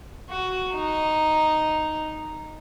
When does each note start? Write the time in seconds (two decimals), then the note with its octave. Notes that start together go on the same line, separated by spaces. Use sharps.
0.30 F#4
0.75 D#4